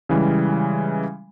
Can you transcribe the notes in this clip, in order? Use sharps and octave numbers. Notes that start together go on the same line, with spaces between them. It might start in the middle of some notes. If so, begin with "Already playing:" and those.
C#3 E3 G3 G#3